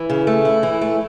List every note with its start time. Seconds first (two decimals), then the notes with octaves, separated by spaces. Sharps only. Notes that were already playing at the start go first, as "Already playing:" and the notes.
Already playing: E3
0.10 C#3
0.27 A3
0.45 E4
0.63 E3
0.81 A3